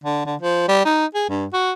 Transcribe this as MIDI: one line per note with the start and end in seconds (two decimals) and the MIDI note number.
0.04 0.22 50
0.26 0.36 50
0.41 0.66 53
0.68 0.83 55
0.85 1.06 63
1.14 1.28 68
1.29 1.46 43
1.53 1.73 66